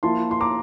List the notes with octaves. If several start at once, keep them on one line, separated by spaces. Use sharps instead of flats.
F3 A#3 E4 A5 C6
C6
A#5 D6